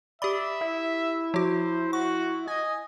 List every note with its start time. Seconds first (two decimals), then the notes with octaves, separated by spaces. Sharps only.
0.22 G4 D5 E5 B5
0.61 E4
1.34 F3 F#4 C5
1.93 F#4 C#6
2.47 D#5 G#5